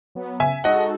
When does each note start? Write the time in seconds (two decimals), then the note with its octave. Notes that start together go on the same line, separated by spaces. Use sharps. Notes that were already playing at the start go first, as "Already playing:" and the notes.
0.15 F#3 B3
0.40 C#3 E5 G#5
0.64 G#3 D#4 F#4 A4 D#5 F#5